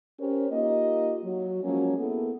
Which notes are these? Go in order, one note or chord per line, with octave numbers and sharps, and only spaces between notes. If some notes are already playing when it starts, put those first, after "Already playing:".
C#4 G4 A#4 C5 C#5
A#3 D#4 F4 G4 D#5
F#3
F3 F#3 G#3 A#3 C#4
A#3 B3 E4 G#4 A4